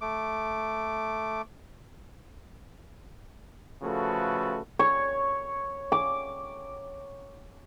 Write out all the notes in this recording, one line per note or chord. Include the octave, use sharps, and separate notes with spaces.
A3 D6
C#3 F3 A3 F#4 A4 B4
C#5
D6